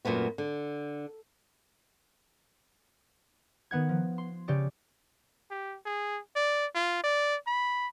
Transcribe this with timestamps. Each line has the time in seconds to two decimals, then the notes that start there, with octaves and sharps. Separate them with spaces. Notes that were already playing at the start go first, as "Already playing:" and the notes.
0.05 F#2 A#2 A3 B3 F#4
0.38 D3
3.71 D#3 B3 F#5 G#6
3.89 F3
4.18 C6
4.48 C#3 G4 C#5 D5
5.51 G4
5.85 G#4
6.36 D5
6.75 F4
7.03 D5
7.47 B5